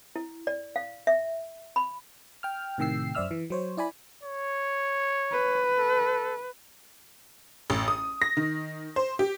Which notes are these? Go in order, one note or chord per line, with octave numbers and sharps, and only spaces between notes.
E4
D5
F5
E5
B5
G5 F6
A2 C3 D#3 G5 E6 C7
F#2 C5 D5 E5 E6 F6
E3
F#3 C5 C#5
E4 D5 G#5 B5
C#5
B4
A4
A1
D#6
A#6
D#3
C5
G4